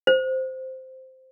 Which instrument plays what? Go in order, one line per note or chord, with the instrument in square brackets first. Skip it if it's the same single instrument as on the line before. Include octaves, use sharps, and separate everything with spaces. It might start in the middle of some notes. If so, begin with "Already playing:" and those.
[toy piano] C5